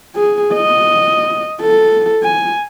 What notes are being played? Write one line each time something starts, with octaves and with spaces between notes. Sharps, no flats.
G#4
D#5
A4
G#5